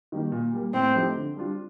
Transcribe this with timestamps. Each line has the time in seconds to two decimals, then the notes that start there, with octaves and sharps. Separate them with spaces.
0.12 D#3 G3 A#3 D#4
0.32 A#2
0.53 G3 A#3
0.73 A2 C4
0.95 F3 A3 D#4 G4
1.16 D3
1.37 G3 D4 F4